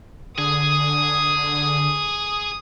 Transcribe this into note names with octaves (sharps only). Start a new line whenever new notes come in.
D3 G#4 D#6